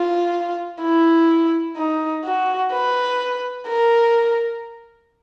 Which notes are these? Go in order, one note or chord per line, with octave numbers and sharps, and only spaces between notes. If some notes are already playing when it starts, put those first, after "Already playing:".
Already playing: F4
E4
D#4
F#4
B4
A#4